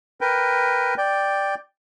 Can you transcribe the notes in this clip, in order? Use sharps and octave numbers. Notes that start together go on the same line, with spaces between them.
A#4 B4 G5
D5 G5